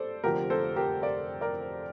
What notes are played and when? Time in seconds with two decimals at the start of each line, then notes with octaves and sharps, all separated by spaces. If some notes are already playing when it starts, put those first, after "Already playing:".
Already playing: G2 A4 C5 D5
0.24 F1 F2 D3 F3 G4 A#4
0.50 A4 C5
0.76 G4 A#4
1.02 A#4 D5
1.41 A#4 D5